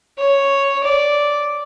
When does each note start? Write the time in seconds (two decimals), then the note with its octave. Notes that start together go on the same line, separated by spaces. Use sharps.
0.18 C#5
0.84 D5